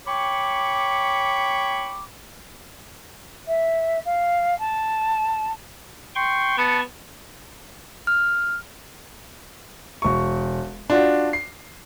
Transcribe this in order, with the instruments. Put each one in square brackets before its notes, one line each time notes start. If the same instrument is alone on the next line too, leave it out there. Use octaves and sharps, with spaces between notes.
[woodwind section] C#5 G5 B5 C#6 D6
[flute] E5
F5
A5
[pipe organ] G5 C6 C#6
[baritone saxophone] B3 [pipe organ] A5 C#6
[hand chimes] F6
[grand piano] E1 C#6
D4 F4 F#4
C7